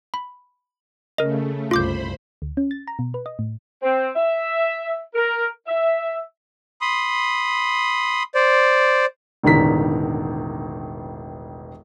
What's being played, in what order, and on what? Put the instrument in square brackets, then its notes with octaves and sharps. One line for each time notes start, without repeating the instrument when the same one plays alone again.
[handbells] B5
[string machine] C#3 A3 [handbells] A#4 D#5
[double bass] F#1 C2 [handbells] F4 D6 G6 [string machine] C5 B5
[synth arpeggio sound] D2
C#4
A6
A#5
B2
B4
D#5
A2
[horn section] C4
E5
A#4
E5
[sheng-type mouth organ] B5 C6 D#6
C5 D5
[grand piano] E1 A1 D3 D#3 A#5 B6